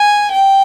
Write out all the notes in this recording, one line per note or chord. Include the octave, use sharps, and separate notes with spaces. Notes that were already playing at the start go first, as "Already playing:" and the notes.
Already playing: G#5
G5